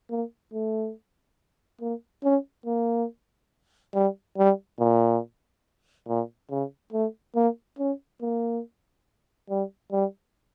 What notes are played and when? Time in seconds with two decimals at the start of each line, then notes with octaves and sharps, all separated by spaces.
0.10 A#3
0.53 A3
1.81 A#3
2.24 C#4
2.66 A#3
3.94 G3
4.38 G3
4.80 A#2
6.08 A#2
6.51 C#3
6.93 A3
7.35 A#3
7.79 C#4
8.22 A#3
9.50 G3
9.92 G3